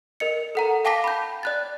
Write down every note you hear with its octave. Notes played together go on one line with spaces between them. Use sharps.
A#4 D#5 C#7
A4 F#5 A#5
F5 G5 A5 D6 A#6 B6
B5 G6
D5 F#6 A6